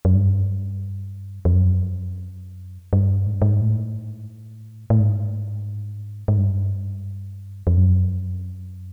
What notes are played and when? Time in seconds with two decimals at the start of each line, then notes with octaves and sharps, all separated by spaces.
0.05 F#2
0.15 G2
1.45 F2
1.54 F#2
2.93 G2
3.27 G#2
3.34 G2
3.42 G#2
3.61 A2
4.90 A2
5.00 G#2
6.28 G#2
6.38 G2
7.67 F2
7.77 F#2